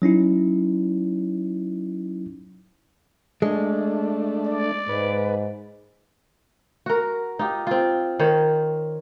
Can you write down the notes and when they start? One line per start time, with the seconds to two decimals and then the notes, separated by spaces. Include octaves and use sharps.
0.02 F#3 C#4 D#4 E4
3.42 G#3 A3 D4
4.46 D5
4.89 G#2 B4
6.86 F#4 A#4
7.39 D#4 F4 G4
7.67 C4 F4
8.20 D#3 C5 C#5